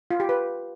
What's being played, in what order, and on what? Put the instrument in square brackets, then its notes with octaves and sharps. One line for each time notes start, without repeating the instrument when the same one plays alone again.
[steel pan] F4
G4
B4